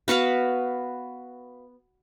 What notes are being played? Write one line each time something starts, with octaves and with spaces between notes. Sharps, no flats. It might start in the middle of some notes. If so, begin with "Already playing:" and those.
B3 F#4 B4 F5